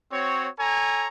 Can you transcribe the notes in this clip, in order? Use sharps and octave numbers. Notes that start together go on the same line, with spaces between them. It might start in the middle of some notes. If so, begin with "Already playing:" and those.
C4 F#4 C#5
A4 C#5 G#5 A#5